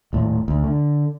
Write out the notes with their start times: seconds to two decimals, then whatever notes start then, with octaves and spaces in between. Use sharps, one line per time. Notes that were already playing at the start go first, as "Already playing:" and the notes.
0.13 D#1 A2
0.48 D2
0.64 D3